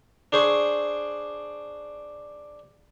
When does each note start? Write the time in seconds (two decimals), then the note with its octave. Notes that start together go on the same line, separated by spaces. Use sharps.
0.32 D4 G#4 C5 C#6